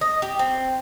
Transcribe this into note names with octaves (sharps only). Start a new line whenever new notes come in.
D#5
G4
C4